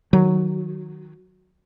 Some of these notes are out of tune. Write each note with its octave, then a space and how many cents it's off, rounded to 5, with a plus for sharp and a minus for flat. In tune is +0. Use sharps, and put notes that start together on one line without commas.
D#3 -5 F#3 -5